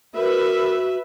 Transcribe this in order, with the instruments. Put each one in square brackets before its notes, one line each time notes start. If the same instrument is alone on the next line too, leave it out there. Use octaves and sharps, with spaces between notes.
[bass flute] F#4 [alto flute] A#4 [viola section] B4 E5